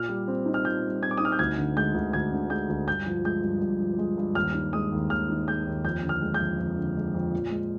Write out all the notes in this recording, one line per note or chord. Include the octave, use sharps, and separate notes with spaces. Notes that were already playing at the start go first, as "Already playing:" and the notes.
Already playing: A#2 F6
G3
C4
D#4
F6
A#2 G6
G3
C4 G#6
D6
D#4 D#6
F6
G6
D2 G#6
D3
G#3 G6
D2
D2 G#6
D3
G#3 G6
D2
G2 G6
F3
G#3 G6
G2
G2
F3
G#3
G2
D#2 F6
D#3
G#3 D#6
D#2
D#2 F6
D#3
G#3 G6
D#2
F2 G6
D3
F6
G#3
G6
F2
F2
D3
G#3
F2
A#2
G#3